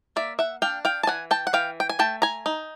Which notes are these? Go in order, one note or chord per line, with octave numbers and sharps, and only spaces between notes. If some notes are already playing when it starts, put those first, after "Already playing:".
A#3 D5 E5
E5 F#5
D4 F5 G5
F5 G5
A5
E3 F#5 G#5
G5 A5
F#5
E3 F5 G5
G5
G#5
A3 G5 A5
G#5 A#5
D#4